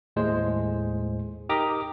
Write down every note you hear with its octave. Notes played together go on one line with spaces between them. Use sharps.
D#2 A2 G#3 C5
D#4 G4 A#4 A#5 D6 D#6